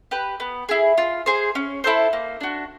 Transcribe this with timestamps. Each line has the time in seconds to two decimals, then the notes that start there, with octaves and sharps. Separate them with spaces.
0.11 G4 B4
0.40 B3
0.69 E4 G#4
0.98 F4
1.26 G#4 C5
1.55 C#4
1.84 E4 A4 C5
2.13 A#3
2.41 D4 F#4